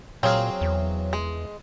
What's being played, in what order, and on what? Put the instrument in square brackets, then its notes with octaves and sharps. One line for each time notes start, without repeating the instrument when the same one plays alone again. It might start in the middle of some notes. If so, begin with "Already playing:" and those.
[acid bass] A#2 [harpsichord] F#3 F5 [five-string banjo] C4 G#4
[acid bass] E2
[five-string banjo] G#3